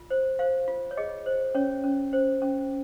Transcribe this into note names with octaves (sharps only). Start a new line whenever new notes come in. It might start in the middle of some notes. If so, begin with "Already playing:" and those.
Already playing: F4
C5
C5 F5
F4
C#5
G#4 D#5
C5
C#4 C#5
C#4
C5
C#4